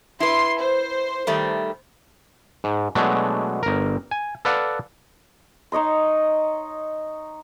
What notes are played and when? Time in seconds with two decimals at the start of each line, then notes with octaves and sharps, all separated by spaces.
0.20 E4 B4 C6
0.60 C5
1.27 D#3 G3 A3
2.64 G#2
2.95 B2 F#3 G#3 A3 D4
3.63 G1 A#4
4.11 G#5
4.45 A4 B4 D5 F5 F#5
5.72 D#4 C#5 D#5 C6